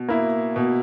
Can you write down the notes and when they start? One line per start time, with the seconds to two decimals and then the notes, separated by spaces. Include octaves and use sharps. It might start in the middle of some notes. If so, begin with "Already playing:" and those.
Already playing: B2
0.09 A#3 E4
0.56 B2